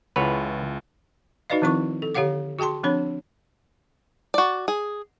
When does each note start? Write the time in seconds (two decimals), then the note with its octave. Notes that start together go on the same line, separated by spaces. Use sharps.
0.16 C#2 C#3 E3 F4 A4 B4 C#5 F#5
1.50 D#4 F#4 B4 D5 D#5 F5
1.62 D#3 F3 C4 E4 C#6 D6
2.02 A4
2.15 D3 G4 C#5 F5 F#5 D6
2.59 F#4 G#4 G5 A5 C6
2.83 F3 C4 D4 C#5 B5
4.34 F#4 D5
4.68 G#4